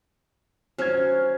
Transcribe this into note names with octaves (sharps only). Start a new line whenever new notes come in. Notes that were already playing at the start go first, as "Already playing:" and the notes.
F#3 C#4 C5 F6 G#6